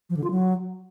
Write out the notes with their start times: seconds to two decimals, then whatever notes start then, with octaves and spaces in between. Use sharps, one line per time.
0.10 F3
0.17 D3
0.24 F4
0.31 F#3